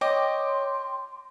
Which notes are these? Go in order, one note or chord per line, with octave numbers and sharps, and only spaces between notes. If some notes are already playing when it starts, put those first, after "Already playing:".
C#5 D#5 G5 C6 D6